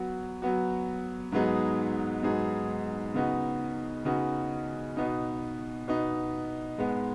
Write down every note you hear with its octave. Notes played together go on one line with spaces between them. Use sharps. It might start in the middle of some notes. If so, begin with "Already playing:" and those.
Already playing: F#3 B3 F#4
F#3 B3 F#4
G#2 F#3 B3 D#4 G#4
G#2 F#3 B3 D#4 G#4
C#3 B3 D#4 F#4
C#3 B3 D#4 F#4
B2 B3 D#4
B2 B3 D#4
G#2 G#3 B3